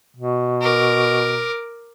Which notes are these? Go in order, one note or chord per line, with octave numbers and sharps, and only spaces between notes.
B2
A#4 D6